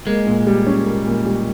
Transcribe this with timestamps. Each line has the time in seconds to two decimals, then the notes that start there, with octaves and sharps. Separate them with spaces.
0.06 G#3 A#3
0.26 A#2
0.47 G3
0.67 C#4
0.86 A#3
1.06 A#2
1.26 G3